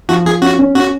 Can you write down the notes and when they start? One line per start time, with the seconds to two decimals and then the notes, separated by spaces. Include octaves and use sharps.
0.09 F3 F#4
0.26 F3 G#4
0.42 C#4 F#4
0.59 C#4
0.75 C#4 F#4